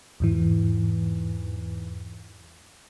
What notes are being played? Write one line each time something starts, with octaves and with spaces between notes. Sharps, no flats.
E2 G#2 E3